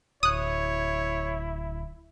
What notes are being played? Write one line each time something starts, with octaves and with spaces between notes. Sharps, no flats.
D1 E4 C#5 D#6 F#6